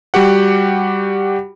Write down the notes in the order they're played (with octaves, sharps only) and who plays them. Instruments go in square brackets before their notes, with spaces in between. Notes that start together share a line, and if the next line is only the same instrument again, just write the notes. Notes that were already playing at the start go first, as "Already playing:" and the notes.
[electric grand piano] G3 F#4 G4 F#5